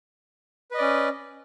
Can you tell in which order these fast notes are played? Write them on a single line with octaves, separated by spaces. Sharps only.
B4 D#5 D5 C#4